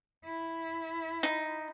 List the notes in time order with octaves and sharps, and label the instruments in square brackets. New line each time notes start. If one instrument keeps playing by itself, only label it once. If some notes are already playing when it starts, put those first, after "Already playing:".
[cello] E4
[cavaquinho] D#4